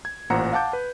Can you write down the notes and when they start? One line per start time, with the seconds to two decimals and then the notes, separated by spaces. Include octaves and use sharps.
0.05 G#6
0.30 A1 A#2 C5 F#5 A#5 C#7
0.53 F5 F#5 A5 D6 G6
0.73 B4